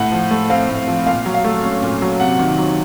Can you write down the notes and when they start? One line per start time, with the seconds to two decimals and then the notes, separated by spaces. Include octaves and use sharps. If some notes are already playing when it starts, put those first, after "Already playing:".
Already playing: A2 F#5
0.12 F3
0.31 A3
0.49 C4 F5
0.69 A2
0.88 F3
1.06 A#2 F5
1.25 F#3
1.34 F5
1.44 A3
1.64 C#4
1.82 A#2
2.02 F#3
2.20 C3 F#5
2.39 D#3
2.58 F#3